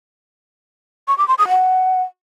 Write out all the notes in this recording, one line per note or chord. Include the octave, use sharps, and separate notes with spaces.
C#6
D6
C6
D#6
F#5